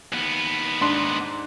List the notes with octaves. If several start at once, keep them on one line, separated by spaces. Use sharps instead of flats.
D#2 B3
G#2 D4 C6